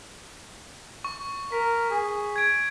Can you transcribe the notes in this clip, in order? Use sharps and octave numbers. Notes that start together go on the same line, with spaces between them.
C#6
A#4 B6
G#4
G#6 D7